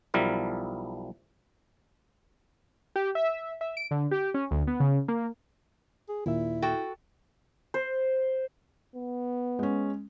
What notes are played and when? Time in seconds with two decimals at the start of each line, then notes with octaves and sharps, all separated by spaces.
0.14 B1 F3 G3 E4 A#4
2.96 G4
3.15 E5
3.61 E5
3.77 D7
3.91 D3
4.11 G4
4.34 C#4
4.51 D2
4.67 B3
4.80 C#3
5.08 A#3
6.09 G#4
6.26 D#2 A#2 E4 E5
6.62 F#4 A4 G5
7.74 C5
8.94 B3
9.59 G#3 C#4